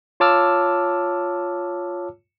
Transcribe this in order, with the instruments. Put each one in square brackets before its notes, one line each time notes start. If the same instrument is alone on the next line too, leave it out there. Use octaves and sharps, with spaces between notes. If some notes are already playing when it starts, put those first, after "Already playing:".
[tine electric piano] F4 C#5 A5 D6 E6 F6